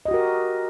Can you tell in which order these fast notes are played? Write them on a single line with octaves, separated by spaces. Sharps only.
D#5 G4 F#4 A#4